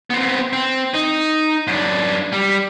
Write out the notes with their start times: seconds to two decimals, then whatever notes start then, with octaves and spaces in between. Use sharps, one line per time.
0.10 B3 C4
0.53 C4
0.94 D#4
1.67 F#2 D4
2.32 G3